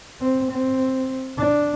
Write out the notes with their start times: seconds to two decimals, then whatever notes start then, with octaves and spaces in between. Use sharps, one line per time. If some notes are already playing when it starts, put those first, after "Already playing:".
0.21 C4
0.51 C4
1.37 D4